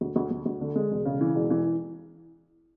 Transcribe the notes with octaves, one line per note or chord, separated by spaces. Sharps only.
D2
D2
D2
D2
D3
G#3
E1
C#3
E3
E1
E3